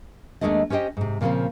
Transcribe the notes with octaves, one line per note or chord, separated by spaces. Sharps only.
D#2 E3 G#3 A3 D4 D#5
C#4 G4 C5 D#5 G5
G#2 C3
A#2 C#3 F3 G3 A#3 C4